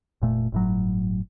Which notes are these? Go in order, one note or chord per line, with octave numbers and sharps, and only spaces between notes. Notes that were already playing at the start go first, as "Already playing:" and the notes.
F1 A#2 A3
G1 A2 F#3